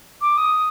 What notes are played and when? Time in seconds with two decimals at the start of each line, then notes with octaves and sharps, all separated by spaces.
0.21 D6
0.37 D#6